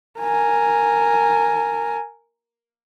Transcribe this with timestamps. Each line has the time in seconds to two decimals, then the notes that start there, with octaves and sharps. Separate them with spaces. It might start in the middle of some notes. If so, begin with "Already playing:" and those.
0.20 A#4 G#5